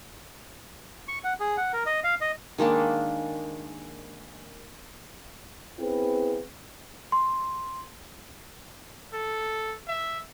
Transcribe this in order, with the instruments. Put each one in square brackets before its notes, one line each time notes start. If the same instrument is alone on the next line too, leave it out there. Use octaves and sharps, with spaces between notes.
[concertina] C#6
F#5
G#4
F#5
A#4
D#5
F5
D#5
[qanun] D#3 G#3 A#3 D4
[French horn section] B3 C4 E4 G#4 B4
[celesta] C6
[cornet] A4
E5